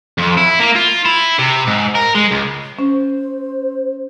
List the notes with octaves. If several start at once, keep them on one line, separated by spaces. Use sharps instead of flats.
F2
E4
A#3
F4
E4
C3
G#2
A#4
G#3
C#2
C#4 C5